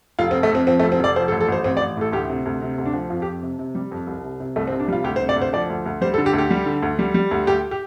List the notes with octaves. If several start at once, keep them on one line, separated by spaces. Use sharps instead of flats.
F1 F4
C4
F2
A3
F2 C4
F3 C4
A3
F1
C4
F1 D5
F3 C5
A4
A1
A4
A1 C5
A1 C4
D5
A1
A2 A4
D2 G4
C3
D2
C3
D2
D4
F3
F2 F4
G4
F2
C3
C3
G3
F2
C2
C3
C3
C2 A3
C4
C3
D4
G3 F4
D2 G4
C5
C3
D5
D2
C5
F3 D5
D2
D2
G3 C5
A4
D3
G4
D2
G4
G3
D3
D2
G3
G3
D2
D2 G4
G4